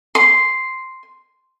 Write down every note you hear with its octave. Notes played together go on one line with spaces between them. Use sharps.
C6